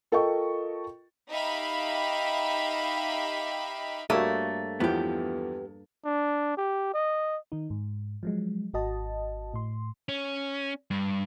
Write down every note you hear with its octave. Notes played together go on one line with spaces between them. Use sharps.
F4 A4 A#4 D#5 G5 C#6
D#4 G4 E5 F5 B5
G2 A3 A#3 F#4 A#4 C#5
E2 E3 F3 B3 G4
D4
G4
D#5
D#3 D#4
G#2
F3 F#3 G#3
G#1 F#4 D#5 A5
A2 C6
C#4
G2